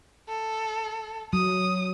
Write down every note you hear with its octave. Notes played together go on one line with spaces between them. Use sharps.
A4
F#3 D#6